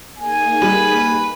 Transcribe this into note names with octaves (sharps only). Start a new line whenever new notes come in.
A#3 D#4 G#4 G#5
G3 B4